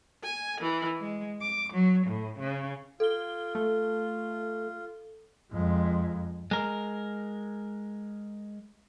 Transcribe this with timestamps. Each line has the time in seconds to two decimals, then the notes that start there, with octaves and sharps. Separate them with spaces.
0.23 G#5
0.61 E3
1.01 G#3
1.41 D6
1.73 F#3
2.05 A2
2.39 C#3
3.00 F4 A4 G7
3.55 A3
5.51 F2 G#3
6.51 G#3 A#4